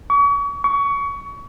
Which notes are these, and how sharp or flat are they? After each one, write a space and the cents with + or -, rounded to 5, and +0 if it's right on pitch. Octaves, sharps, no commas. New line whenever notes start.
C#6 +40
C#6 +25